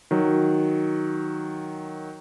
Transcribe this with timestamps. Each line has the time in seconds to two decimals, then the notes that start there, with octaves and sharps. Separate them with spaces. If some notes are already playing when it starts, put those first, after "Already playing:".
0.11 D#3 F#3